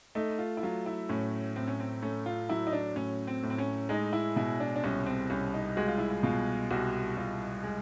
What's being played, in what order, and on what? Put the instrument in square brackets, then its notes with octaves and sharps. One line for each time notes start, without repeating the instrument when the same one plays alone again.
[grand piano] A3 [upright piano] D#4
[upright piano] F4
E4
[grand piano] F#3 [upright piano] F4
[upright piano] E4
[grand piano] A2 [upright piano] C#4
[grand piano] A2 [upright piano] C4
[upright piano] C#4
C4
[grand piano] A3 [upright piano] C#4
[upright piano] F4
[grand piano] F#3 [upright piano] E4
[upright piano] D#4
D4
[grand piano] A2 [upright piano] C#4
[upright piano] C4
[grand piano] A2
[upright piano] C4
C#4
[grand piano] G#3 [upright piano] D#4
[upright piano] E4
[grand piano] B2 [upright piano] E4
[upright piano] D4
D4
[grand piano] C2 [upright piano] C#4
[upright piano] C4
[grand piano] C2 [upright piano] C#4
[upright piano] D#4
[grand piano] G#3 [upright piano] F#4
[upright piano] F4
E4
F4
[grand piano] B2 [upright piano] F4
[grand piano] C2 [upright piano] F#4
[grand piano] C2 [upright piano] F4
[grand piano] G#3